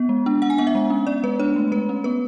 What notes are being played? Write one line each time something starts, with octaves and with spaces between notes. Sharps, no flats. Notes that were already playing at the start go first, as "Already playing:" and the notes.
Already playing: B3
G#3
D4
D4 F#5
G#5
B3 F#5
E5
G#3
C#4
B3 D5
G#3 B4
D4 C#5
A3
G#3 B4
C#4
B3 B4